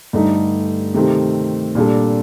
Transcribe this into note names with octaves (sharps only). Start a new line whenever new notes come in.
G2 D3 A3 D#4
C3 D#3 A3 C4 G4
A#2 G3 D4 A4